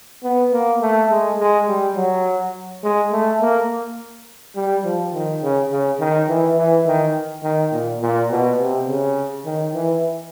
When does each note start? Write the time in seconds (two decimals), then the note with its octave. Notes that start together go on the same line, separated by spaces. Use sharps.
0.23 B3
0.52 A#3
0.81 A3
1.10 G#3
1.39 G#3
1.67 G3
1.96 F#3
2.83 G#3
3.12 A3
3.41 A#3
4.56 G3
4.84 F3
5.13 D#3
5.42 C#3
5.71 C#3
6.00 D#3
6.28 E3
6.57 E3
6.86 D#3
7.43 D#3
7.72 A#2
8.01 A#2
8.30 B2
8.59 C3
8.88 C#3
9.45 D#3
9.74 E3